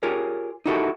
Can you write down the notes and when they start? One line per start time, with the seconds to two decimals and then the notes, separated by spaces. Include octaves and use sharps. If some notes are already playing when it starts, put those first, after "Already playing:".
0.03 F4 G4 G#4 A#4 C#5
0.66 D#4 E4 F#4 G4 A4 A#4